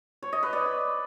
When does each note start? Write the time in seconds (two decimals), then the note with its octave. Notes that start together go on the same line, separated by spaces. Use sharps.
0.23 C#5
0.33 D#5
0.43 B4
0.53 D5